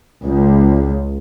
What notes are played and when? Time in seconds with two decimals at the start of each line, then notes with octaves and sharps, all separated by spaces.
0.23 C#2